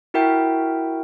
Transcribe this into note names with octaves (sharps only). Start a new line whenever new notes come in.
E4 F#4 A#4 E5 G5